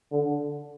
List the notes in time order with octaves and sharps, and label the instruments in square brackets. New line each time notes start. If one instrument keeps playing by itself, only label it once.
[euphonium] D3